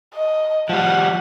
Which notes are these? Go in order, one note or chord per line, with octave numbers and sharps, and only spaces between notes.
D#5
F3 G3 F#5